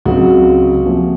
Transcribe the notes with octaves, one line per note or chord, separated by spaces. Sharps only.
C#2 C#3 F#3 C4 F#4
C3 F3 A#3 C#4